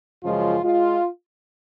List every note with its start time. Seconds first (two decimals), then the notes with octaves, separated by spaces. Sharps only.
0.24 F#2 C#3 F3 G#3 F4
0.64 G#3 F4